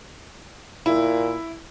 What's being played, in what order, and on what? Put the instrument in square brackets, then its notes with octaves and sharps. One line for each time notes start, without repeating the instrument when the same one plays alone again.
[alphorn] A#2 [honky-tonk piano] E4